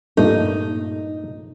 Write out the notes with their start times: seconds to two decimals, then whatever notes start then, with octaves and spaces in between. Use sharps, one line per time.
0.17 G2 A#2 A3 D#4